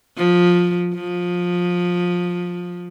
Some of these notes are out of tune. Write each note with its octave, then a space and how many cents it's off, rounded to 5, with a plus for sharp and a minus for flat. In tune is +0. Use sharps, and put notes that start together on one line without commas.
F3 +15
F3 +20